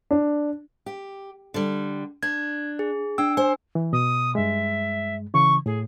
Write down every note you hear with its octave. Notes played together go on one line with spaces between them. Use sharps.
D4
G4
D3 G3
D4 G#6
G#4
D4 G5 E6
C5 G#5
E3
B2 D#6
G2 G#3 E5
C#3 E3 C#6
A2 G#4